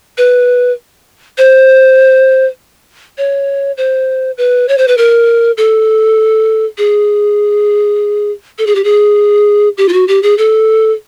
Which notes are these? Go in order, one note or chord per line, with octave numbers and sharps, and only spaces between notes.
B4
C5
C#5
C5
B4
C#5
C5
B4
A#4
A4
G#4
A4
G#4
G4
G#4
G4
F4
F#4
G4
G#4
A4